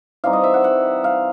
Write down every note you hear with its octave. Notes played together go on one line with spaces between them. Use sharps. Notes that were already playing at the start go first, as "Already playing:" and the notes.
E3 G3 C4 D#4 F5
D#5
E5
F#5
F#5
F5